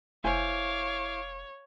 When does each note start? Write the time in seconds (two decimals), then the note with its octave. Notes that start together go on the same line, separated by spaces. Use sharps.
0.24 F1 E4 C5 C#5 F5 G#5 D6